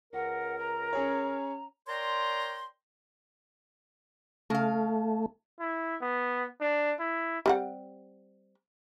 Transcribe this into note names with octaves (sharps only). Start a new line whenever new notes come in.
C#2 A#4 F#5
A#5
C#4 G#4 C#5
A#4 C#5 D5 G5 A#5 C6
C#3 A3 F5
E4
B3
D4
E4
G3 C4 F#5